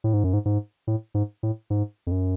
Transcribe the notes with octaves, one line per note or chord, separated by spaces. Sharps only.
A2
G#2
F#2
G#2
G#2
A2
G#2
A2
G#2
F2
F#2